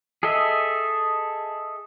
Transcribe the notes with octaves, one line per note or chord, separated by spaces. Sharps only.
G#4 A4 D#5 E5